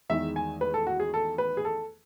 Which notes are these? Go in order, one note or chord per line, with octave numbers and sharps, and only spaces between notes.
E2 D#3 G#3 E5
G#5
B4
A4
F#4
G#4
A4
B4
G#4
A4